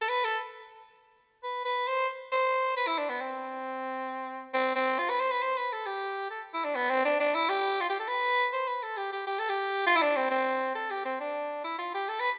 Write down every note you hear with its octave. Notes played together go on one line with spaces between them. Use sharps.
A4
B4
A4
B4
B4
C5
C5
B4
E4
D4
B3
C4
C4
C4
F4
B4
C5
B4
C5
B4
A4
G4
A4
E4
D4
B3
C4
D4
D4
E4
G4
F4
G4
A4
B4
C5
B4
A4
G4
G4
G4
A4
G4
F4
E4
D4
C4
C4
A4
G4
C4
D4
E4
F4
G4
A4
B4